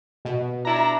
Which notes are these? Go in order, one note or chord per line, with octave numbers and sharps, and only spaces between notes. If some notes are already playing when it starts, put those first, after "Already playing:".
B2
D4 E4 A5 A#5